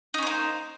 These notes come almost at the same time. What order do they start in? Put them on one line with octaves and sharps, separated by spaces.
D#4 C#4 C5 A#3